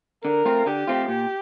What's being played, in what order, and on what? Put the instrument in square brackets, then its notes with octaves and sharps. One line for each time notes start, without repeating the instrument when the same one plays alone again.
[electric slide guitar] D3 [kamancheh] A#4
[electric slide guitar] A3 C4 F4
[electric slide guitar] D3 [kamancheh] G4
[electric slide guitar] A3 C4 F4
[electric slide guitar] A#2 [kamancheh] G4